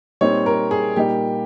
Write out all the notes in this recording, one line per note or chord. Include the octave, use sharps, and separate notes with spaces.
A#2 G3 C4 D#4 C#5
A#4
G#4
A#2 G3 A#3 D#4 G4